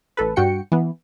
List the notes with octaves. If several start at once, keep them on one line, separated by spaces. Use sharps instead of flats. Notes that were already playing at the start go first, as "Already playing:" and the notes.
A1 A4 B4
G2 F#4 G5 C#7
E3 B3